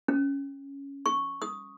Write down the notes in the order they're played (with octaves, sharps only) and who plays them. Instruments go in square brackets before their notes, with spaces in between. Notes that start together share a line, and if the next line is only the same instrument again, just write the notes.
[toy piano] C#4
C#6
D#6